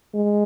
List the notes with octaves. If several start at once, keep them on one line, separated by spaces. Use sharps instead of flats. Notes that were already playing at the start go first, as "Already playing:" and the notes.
G#3